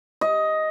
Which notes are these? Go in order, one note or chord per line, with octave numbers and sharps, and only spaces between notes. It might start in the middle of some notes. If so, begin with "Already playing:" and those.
D#5